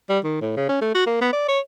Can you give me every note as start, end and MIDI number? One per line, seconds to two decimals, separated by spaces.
0.10 0.19 55
0.24 0.39 51
0.41 0.56 45
0.56 0.68 49
0.69 0.77 61
0.81 0.91 57
0.94 1.05 66
1.06 1.21 58
1.21 1.29 59
1.33 1.44 74
1.48 1.59 73